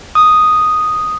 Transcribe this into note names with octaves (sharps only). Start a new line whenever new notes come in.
D#6